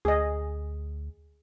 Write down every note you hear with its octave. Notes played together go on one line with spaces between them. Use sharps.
D2 G#4 D#5